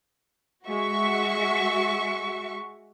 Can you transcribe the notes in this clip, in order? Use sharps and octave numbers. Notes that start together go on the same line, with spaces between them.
G#3 F#4 E5 C#6